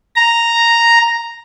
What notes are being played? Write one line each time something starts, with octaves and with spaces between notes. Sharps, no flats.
A#5